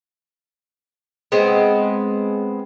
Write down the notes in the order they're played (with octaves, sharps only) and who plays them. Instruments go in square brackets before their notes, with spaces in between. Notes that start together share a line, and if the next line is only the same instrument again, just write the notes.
[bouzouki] G#3 B3 C4